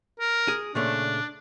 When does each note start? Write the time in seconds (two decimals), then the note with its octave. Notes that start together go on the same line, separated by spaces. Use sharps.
0.20 A#4
0.48 G#4
0.75 A#2 C#3 A3 D4